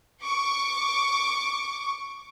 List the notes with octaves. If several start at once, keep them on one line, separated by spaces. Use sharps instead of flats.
C#6 D6